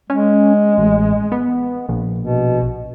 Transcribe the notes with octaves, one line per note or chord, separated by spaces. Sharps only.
G#3 C#4
A1
B3
A#1
B2